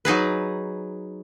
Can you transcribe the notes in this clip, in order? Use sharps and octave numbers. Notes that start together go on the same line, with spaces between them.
F#3 D#4 G#4 B4